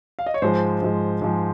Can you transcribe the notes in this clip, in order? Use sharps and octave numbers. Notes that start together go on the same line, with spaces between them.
F5
D#5
C#5
G#2 F3 G#3 C5
G#2 F3 G#3
G#2 F3 G#3